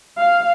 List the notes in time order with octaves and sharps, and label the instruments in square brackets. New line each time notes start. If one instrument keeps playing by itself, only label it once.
[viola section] F5